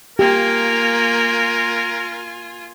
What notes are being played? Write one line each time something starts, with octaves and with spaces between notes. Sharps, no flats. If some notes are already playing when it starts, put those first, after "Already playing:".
A#3 F4 G4 A#4 G#5